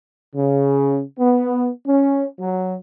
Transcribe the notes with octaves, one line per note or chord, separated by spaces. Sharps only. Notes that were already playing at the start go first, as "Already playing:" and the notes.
C#3
B3
C#4
F#3